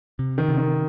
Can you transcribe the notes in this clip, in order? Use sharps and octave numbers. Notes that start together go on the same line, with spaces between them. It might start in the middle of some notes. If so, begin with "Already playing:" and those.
C3
D#3
C3
D#3